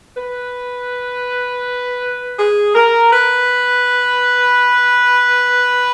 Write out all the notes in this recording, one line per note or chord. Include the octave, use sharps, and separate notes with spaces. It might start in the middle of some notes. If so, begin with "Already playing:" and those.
B4
G#4
A#4
B4